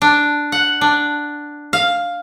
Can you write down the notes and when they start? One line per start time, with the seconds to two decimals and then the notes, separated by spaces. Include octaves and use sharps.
0.02 D4
0.52 F#5
0.81 D4
1.73 F5